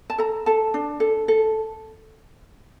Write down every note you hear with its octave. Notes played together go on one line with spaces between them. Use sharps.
A5
A4 A#5
A4 A5
D4
A4
A4